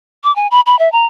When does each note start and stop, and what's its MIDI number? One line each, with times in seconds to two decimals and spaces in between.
0.24 0.34 86
0.36 0.47 80
0.51 0.60 83
0.66 0.78 83
0.79 0.91 76
0.92 1.06 82